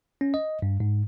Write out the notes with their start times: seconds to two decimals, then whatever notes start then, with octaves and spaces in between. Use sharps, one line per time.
0.21 C#4
0.34 D#5
0.62 G2
0.80 G#2